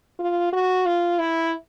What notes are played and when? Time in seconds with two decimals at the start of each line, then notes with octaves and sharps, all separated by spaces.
0.20 F4
0.53 F#4
0.86 F4
1.19 E4